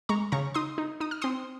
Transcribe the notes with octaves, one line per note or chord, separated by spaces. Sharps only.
G#3 A#5 C#6
C#3 A#5 C#6
D#4 C6 D#6
D#4
D#4 D#6
F6
C4 C6 D#6